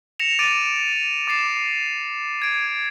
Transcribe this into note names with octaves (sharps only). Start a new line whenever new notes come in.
A#6 C#7 E7 F7
D6 A6 D7 D#7
D6 A6 C7 E7
G#6 D7